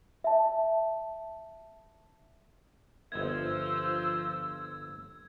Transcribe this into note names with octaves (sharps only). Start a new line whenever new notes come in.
E5 A5
G1 F3 F4 C5 D#5 E5 E6 G#6